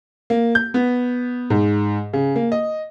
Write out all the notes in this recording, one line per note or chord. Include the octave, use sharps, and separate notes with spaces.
A#3
G6
B3
G#2
C#3
A#3
D#5